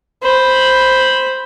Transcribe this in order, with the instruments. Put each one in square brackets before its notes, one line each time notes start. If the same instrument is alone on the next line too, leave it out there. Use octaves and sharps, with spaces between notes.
[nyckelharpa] C5 B5